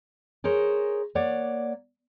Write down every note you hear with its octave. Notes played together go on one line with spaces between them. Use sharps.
G#4 A#4 C5 C#5
A#3 C#5 D5 F#5